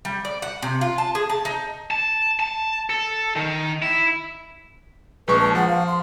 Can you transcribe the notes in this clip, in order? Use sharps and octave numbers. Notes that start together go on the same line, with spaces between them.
G3
D5
F#5
C3
F4
A5
G#4
A5
D#4
A5
A5
A4
D#3
E4
A#1 G#3 B4 C#6
A5
F3 F#5
F5
C6